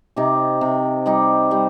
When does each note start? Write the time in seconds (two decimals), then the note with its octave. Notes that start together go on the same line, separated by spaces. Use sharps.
0.16 C3 D#4 G4
0.61 C3
1.06 G3 D#4 G4
1.51 G3 C4 D#4